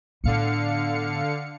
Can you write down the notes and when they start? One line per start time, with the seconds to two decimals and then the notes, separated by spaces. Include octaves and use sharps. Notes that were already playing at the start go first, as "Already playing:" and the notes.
0.24 A2 D3 B3 F5 C#7